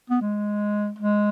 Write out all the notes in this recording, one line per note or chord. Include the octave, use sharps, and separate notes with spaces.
B3
G#3
G#3